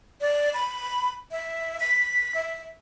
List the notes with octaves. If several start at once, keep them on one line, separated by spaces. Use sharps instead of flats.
D5
B5
E5
B6
E5